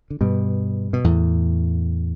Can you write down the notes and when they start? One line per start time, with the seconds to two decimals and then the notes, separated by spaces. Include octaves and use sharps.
0.10 D3
0.21 G2 B2
0.93 B2
1.04 E2 A2